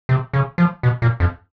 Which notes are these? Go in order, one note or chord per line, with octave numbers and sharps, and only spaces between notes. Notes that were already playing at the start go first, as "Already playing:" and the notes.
C3
C#3
F3
B2
A#2
F2